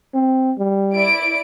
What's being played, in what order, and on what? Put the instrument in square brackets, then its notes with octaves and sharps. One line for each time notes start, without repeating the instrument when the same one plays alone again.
[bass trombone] C4
G3
[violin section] E4 D5 D7